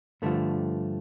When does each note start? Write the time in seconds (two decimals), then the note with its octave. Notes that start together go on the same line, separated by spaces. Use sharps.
0.22 G2 D3 F3 A3